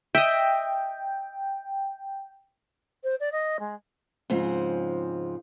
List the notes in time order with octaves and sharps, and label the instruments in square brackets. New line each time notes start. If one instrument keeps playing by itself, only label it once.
[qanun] D#5 E5 [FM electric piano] G5
[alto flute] C5
D5
D#5
G#3
[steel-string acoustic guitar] G#2 C#3 F3 C4